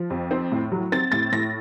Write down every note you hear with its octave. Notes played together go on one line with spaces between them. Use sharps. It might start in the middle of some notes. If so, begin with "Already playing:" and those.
Already playing: F3
F2
C4
A2
F#3
C4 A6
A2 A6
A2 A#6